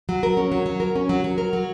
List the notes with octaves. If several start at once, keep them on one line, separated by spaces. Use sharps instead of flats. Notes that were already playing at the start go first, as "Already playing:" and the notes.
F#3
A#4
C#4
F#3
F#3
A#4
C#4
F#3
F#3
A#4
F#3